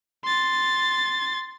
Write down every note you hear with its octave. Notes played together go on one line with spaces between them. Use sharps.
C6 A6